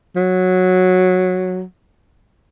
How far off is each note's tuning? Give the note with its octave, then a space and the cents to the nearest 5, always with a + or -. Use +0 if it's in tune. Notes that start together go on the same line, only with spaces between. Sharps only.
F#3 -10